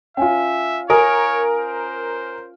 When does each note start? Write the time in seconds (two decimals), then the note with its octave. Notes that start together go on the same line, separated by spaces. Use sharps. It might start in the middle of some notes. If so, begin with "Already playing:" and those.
0.17 C#4 F4 E5 G5 G#5
0.90 A#4 C#5 G#5 D#6 D7
1.60 C5